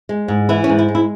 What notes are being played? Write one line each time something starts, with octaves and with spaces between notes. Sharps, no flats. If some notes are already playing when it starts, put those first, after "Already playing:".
G#3
G#2
E3 E4
C#4
G#2
E4
G#3
E4